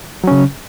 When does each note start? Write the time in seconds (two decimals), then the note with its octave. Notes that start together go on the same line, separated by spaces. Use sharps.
0.24 F#3
0.27 C#4
0.31 C#3